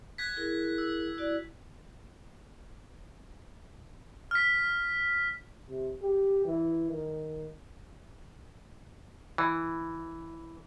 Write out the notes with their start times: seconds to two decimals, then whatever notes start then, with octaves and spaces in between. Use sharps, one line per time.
0.18 F#6 G#6 B6
0.36 E4 G#4 A#4
0.78 E6
1.18 E4 F#4 D5
4.31 F6 B6
5.69 C3
6.01 G4
6.45 E3
6.90 D#3
9.38 E3